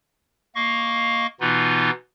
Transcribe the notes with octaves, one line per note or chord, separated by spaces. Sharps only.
A#3 D#5 F5 C#6
B2 E3 B3 D#4 F4